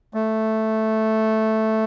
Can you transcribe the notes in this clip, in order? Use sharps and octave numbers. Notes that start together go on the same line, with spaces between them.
A3